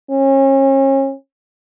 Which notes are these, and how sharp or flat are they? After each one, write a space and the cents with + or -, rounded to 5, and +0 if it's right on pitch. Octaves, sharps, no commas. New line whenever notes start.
C#4 -35